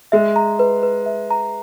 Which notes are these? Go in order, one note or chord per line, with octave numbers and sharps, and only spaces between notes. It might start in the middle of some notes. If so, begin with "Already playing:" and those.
G#3 E5
A#5
B4
B4
E5
A#5